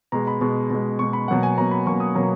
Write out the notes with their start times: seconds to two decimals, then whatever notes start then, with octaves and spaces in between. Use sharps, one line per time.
0.12 B2 G#3 A#5
0.27 B5
0.41 B2 G#3
0.70 B2 G#3
0.99 B2 G#3 C#6
1.13 B5
1.28 B2 F#3 A#3 F#5
1.43 G#5
1.57 B2 F#3 A#3 A#5
1.71 B5
1.86 B2 F#3 A#3 C#6
2.00 D#6
2.15 B2 F#3 A#3